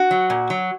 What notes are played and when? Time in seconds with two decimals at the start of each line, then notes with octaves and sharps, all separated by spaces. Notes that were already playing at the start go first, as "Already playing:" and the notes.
Already playing: F#4
0.11 F#3
0.30 A#2
0.50 F#3